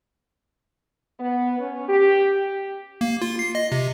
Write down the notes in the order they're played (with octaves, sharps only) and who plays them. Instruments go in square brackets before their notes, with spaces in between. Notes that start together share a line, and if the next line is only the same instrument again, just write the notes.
[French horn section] B3
C#4
G4
[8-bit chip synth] A#3
F4
C7
D#5
C3